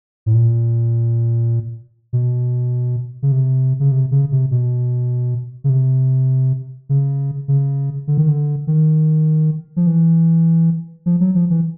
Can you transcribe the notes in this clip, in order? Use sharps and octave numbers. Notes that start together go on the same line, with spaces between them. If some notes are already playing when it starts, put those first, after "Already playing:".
A2
A#2
B2
C#3
C3
C#3
C3
C#3
C3
B2
C#3
C3
C#3
C#3
D3
D#3
D3
D#3
F3
E3
F3
F#3
F3
E3